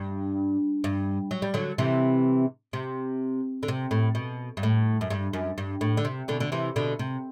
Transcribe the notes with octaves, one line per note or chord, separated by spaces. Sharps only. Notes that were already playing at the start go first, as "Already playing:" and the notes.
Already playing: G2
G2
F#3
G3
D3 F#3
C3 E3
C3
D3
C3
A2
B2
G2
A2
F#2
G2
F#2
G2
A2
D3
C3
B2 D3
D3
C3 E3
B2 D3
C3